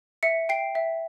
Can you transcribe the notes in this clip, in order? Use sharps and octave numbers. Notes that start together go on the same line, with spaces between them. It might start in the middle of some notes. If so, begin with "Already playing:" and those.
E5 C#7
G5 C7
E5